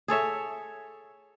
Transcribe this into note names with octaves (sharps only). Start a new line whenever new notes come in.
G#4 A4 C#5 E5